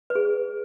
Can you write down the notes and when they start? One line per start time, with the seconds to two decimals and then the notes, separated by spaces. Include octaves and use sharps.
0.10 B4
0.15 G#4